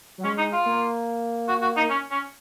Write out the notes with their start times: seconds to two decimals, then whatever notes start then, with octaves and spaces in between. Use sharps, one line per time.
0.18 F#3
0.24 G#3 C#4
0.38 D#4
0.53 F4
0.66 A#3
1.48 F#4
1.62 F#4
1.77 D#4
1.90 C#4
2.11 C#4